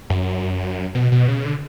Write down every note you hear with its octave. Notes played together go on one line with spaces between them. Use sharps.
F#2
B2
B2
C#3
D3